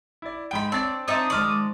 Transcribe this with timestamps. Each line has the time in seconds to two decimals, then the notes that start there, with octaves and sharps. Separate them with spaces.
0.22 E4 D5
0.51 G#2 G5 B5 D7
0.72 C4 D4 C#5 D5 A5 A6
1.08 C4 D4 D#4 E5 A#5 D#6
1.30 D#3 F3 G#3 D5 C#6 F6